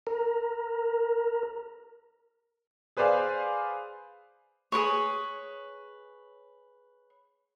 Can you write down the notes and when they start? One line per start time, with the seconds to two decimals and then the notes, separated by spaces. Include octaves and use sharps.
0.07 A#4 A#5
2.97 G#4 B4 C5 D5 F5 G#5
4.72 G#4 A#4 B4 C#5